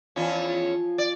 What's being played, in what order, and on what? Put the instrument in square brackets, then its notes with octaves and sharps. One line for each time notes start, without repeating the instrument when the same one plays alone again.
[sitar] E2 C#4 [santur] F3 G#5
[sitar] D5